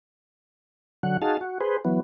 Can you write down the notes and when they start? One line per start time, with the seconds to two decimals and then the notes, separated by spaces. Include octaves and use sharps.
1.03 D3 F#3 F#5
1.22 D#4 F#4 G#4 F5 A5
1.41 F#4
1.60 G#4 B4 C5
1.85 E3 F#3 B3